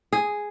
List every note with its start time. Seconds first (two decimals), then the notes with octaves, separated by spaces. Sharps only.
0.13 G#4